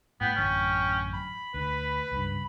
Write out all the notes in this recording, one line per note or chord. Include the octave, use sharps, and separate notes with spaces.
A2 B3 G5
A1 F#2 D3 C#4
B5
D2 B4
C#2 G2